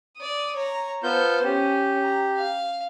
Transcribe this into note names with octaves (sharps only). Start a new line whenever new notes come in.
D5 D#6
C#5 A#5
B3 F4 A4 C5 G6
C#4 G4
A#5
F5